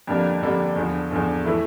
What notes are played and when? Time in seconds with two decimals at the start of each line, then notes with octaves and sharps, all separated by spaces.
0.07 F2 D3 G3 A#3 D4
0.42 F2 D3 G3 A#3 D4
0.76 E2 D3 F3
1.11 E2 D3 F3
1.44 E3 A3 E4